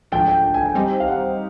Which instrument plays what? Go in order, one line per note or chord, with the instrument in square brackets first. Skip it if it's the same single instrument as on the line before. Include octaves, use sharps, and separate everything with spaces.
[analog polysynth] G#2 F3 A3 D4 [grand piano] G5
[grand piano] G5
G5
G#5
G5
[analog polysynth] G3 C4 D#4 G4 C5
[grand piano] F5
F#5